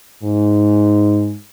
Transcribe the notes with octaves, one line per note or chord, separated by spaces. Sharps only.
G#2